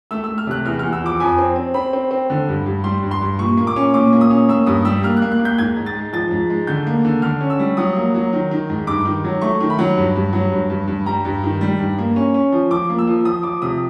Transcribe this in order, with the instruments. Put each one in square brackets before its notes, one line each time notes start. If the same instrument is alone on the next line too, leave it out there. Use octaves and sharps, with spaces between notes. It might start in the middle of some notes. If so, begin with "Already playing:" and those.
[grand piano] A3 E6
A3 E6
F6
C3 F#6
E2 F6
E2 F6
E6
F3 D6
F2 G#5
C4
C4
C4 B5
C4
C4
D3
G2
G2
G3 C6
G2
C6
G2
A#2 C#6
A#3
D6
C#4
A#2 D6
A#3
D#6
C#4
A#3 E6
G2 D#6
G3 E6
A#3 F6
F#6
A#3
F#6
A#3
G6
G#2 G#6
G#2
A6
G#3
F3 A6
G#2
G#3
D3 G6
A#3
D3
D3 F6
C#4
E6
G3
F#3 D#6
A#3
F#3
D#3
D#3
G#2
G2 D6
D#3
F#3
A3 C#6
D#3
B5
F#3
G2
G2
F#3
G2
G2
G2
G3 A#5
G2
D#3
G3
G2
A#3
C#4
C#4
F3
F3 D6
A#3
E6
F3
F3 D#6
F3 D6
C3 D#6